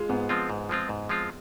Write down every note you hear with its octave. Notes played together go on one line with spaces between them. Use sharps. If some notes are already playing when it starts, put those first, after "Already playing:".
Already playing: G#3 F4
G#2 B3
F3 G#3 C4 F4
G#2
F3 G#3 C4 F4
G#2
F3 G#3 C4 F4